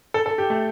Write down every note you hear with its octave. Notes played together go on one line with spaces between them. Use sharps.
A4
A4
G4
A3